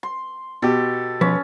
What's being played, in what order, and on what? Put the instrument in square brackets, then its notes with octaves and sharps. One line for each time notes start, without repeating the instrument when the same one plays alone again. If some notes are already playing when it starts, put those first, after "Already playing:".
[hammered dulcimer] C6
[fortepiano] B2 G4 [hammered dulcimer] A4
[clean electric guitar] B1 F3 B4 [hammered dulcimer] C#4